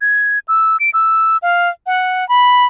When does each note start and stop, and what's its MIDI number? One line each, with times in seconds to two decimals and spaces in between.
0.01 0.39 92
0.48 0.77 88
0.80 0.90 98
0.94 1.37 88
1.42 1.70 77
1.86 2.27 78
2.29 2.66 83